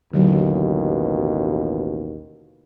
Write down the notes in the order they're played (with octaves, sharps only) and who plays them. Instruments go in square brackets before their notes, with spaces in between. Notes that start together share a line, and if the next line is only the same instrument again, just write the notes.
[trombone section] A1 D#2 B2 [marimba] D3 F#3